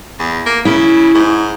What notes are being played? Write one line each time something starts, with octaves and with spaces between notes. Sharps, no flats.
E2
A#3
C#3 E4
G#2